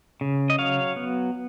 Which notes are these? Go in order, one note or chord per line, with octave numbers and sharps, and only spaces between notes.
C#3
D#5
F#3 C#5 F5
B3